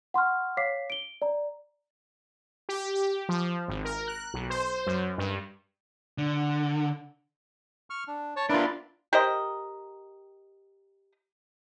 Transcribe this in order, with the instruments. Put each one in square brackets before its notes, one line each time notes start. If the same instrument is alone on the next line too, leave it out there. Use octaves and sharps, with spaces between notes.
[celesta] F#5 C6 C#6 F6
C#5 F5 D6 B6 C7
D7 G7
D5 A#5
[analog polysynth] G4
G4
F3
G#1
A#4
F#6
B1
C5
C5
F#2
G2
[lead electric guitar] D3
[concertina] C#6 F6
D4
C#5 A5
[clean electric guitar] D4 F4 [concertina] E4 A#4 B4
[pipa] G4 A#4 C5 D#5